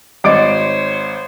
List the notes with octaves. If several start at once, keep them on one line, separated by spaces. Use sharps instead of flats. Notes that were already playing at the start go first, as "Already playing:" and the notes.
G#1 C5 C#5 D#5 F#5 D6 D7